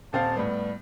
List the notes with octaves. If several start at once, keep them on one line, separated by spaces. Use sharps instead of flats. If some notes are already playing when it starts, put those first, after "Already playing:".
D#1 C4 F5 A5
A2 G3 B3